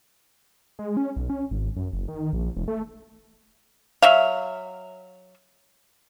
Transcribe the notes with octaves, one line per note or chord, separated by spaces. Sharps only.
G#3
C#4
B1
C#4
G#1
F#2
F#1
D#3
A#1
E1
A3
F#3 E5 F5